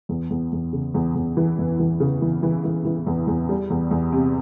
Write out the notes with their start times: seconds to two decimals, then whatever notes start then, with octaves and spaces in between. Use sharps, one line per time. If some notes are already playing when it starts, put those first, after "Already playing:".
0.09 E2
0.31 E2
0.52 E2
0.73 C#3
0.94 E2
1.15 E2
1.37 E3
1.59 E2
1.79 E3
2.00 C#3
2.22 E3
2.43 E3
2.64 E3
2.85 E3
3.07 E2
3.27 E2
3.49 G3
3.70 E2
3.91 E2
4.12 C3